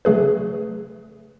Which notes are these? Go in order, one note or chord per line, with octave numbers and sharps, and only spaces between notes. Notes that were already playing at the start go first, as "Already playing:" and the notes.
C#3 F#3 A3 G#4 B4